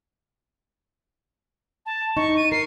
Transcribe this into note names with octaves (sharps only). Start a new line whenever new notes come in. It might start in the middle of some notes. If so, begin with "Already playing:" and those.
A5
D#4 C#6
D#7
A#4 C7